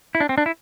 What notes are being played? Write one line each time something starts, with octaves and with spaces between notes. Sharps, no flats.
E4
D4
C4
D4
E4